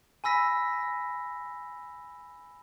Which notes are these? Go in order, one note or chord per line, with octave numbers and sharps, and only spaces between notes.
G#5 B5 E6 A#6 B6